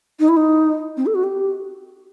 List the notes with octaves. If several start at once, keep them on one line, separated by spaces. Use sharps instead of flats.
D#4
E4
D#4
C4
A4
F#4
G4